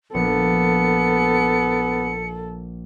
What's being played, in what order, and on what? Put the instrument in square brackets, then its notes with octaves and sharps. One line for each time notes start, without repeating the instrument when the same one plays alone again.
[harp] A#1 [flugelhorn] B3 [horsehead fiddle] A4 [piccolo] C#7